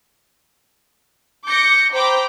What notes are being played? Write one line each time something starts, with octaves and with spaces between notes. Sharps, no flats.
D6 G6 A#6 C#7
C5 G5 A#5 B5 D6